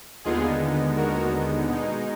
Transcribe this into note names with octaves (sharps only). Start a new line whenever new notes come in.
D#2 D3 G#3 B3 D#4 F4 G#4
F#4 A#4
B2 G#3 D#4